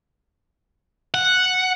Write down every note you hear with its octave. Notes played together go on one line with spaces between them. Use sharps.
F#5